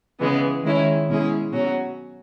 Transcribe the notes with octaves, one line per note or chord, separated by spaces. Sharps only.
C#3 E3 G#3 B3
D#3 G#3 C#4 E4
B2 G#3 C#4 E4 G#4
B2 F#3 C#4 F#4